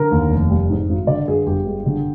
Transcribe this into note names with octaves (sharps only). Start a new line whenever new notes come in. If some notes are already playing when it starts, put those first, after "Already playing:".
Already playing: D3 A#4
D#2
F1
G3
G#2
G#1
D3 D5
G2 G#4
G1 G4
G#3
D3